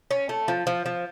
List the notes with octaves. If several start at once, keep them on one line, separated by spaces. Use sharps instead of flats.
C#4
A3
F3
F3
F3